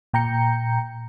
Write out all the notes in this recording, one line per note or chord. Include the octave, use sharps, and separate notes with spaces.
A#2 G5 A#5 G6 C#7